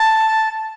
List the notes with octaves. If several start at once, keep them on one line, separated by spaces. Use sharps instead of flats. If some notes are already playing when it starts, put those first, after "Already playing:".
Already playing: A5